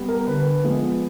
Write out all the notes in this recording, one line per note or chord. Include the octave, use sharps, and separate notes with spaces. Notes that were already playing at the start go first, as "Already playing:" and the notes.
Already playing: G3 B3
A#4
D3 B4
F3 G#3 B3